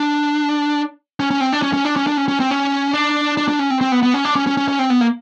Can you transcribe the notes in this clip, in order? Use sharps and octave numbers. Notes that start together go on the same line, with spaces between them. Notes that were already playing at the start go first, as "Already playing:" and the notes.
Already playing: D4
C#4
C#4
C4
D4
C#4
C#4
D4
C#4
D4
C#4
C#4
C4
C#4
D4
D4
D4
C#4
C4
C4
B3
B3
C#4
D4
C#4
C#4
C#4
C#4
C4
B3
A#3